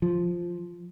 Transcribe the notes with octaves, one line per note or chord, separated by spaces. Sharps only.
F3